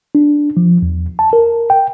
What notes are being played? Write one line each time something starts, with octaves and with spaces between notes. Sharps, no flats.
D4
F3
E2
A5
A#4
G5